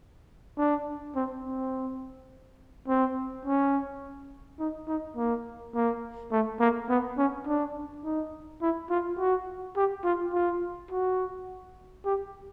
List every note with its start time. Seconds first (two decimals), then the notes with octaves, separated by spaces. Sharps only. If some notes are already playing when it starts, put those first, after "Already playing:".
0.58 D4
1.15 C4
1.43 C4
2.88 C4
3.45 C#4
4.59 D#4
4.88 D#4
5.17 A#3
5.75 A#3
6.32 A3
6.60 A#3
6.89 B3
7.18 C#4
7.47 D4
8.04 D#4
8.62 E4
8.90 F4
9.18 F#4
9.76 G4
10.04 F4
10.33 F4
10.91 F#4
12.05 G4